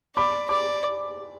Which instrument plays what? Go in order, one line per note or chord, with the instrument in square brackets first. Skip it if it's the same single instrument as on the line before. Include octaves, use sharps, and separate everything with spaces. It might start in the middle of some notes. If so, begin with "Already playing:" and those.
[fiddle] D5 [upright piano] B5 D6
[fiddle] D5 [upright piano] B5 D6